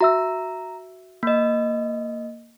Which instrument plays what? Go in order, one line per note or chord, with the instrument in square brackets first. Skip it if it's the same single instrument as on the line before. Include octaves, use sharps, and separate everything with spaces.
[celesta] F#4 E5 E6 [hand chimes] A#5
[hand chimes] A#3 D#5